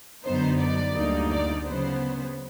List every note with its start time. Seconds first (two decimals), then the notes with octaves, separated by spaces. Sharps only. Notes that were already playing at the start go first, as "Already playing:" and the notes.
0.25 F#2 D3 F#3 B3 D#4 C5
0.60 D5
0.95 D2 D3 G3 A#3 D#4
1.31 D5
1.67 C#3 F#3 B3 C5